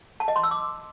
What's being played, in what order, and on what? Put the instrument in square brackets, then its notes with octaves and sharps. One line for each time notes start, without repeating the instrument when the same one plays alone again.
[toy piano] A5
D#5
C6
E6
D6